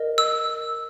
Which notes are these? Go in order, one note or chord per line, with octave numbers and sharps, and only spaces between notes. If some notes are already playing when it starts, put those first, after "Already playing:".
Already playing: A#4 D#5
E6